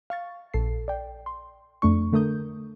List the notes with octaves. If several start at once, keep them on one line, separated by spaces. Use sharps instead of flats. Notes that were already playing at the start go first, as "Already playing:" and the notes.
F5 C#6 A6
A#1 A4 C7
D5 G5
C6
F2 A3 D4 C#6
D3 A3 A#4 D#6 G6